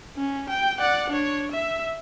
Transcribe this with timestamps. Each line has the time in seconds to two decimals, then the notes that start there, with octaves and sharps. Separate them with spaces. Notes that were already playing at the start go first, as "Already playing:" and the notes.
0.17 C#4
0.50 G5
0.80 D5 F#5
1.10 D4 C#5
1.52 E5